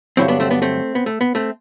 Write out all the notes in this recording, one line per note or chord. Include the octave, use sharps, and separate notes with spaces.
G2 D3 F#3 C4 E4
B3 D4
A3 C4
B3 D4
A3 C4
B3
A3
B3
A3 C4